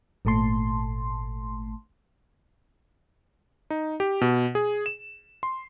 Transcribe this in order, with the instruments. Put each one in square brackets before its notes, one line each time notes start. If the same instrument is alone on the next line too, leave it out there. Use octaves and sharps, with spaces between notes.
[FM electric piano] G#1 A#2 A3 A5 C6
[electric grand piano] D#4
G4
B2
G#4
E7
C6